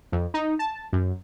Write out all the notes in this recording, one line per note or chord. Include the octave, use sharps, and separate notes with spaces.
F2
D#4
A5
F#2